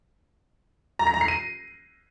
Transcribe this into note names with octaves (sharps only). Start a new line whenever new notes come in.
A#5
A#6
A#5
C7
D#7